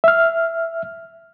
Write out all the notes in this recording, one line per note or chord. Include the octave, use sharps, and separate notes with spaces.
E5 F6